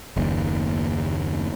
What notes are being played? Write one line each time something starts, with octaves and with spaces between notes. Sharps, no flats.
F#1 D#2